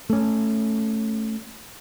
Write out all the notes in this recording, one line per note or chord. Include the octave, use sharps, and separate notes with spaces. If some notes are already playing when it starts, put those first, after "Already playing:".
A3 C#4